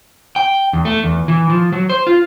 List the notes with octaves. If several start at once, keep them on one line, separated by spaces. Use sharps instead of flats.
G5
E2
A3
E2
E3
F3
F#3
C5
F4